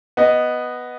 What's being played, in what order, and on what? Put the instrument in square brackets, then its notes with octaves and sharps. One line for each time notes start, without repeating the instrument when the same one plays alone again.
[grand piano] B3 D#5